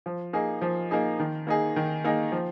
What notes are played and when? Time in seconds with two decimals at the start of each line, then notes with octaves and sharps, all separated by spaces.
0.06 F3
0.33 A#3 D#4 G#4
0.62 F3
0.91 A#3 D#4 G#4
1.20 D#3
1.47 A#3 D#4 G#4
1.76 D#3
2.04 A#3 D#4 G#4
2.32 F3